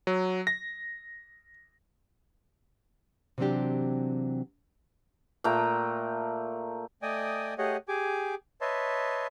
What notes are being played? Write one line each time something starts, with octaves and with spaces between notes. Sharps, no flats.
F#3
A#6
C3 E3 F#3 C4 D4 G4
A#2 A3 G5 A#5
A3 D5 D#5 G5 G#5 D#6
A3 G4 G#4 C#5 D#5 F#5
G4 G#4 G#5 D6
B4 C#5 D#5 E5 A5 C6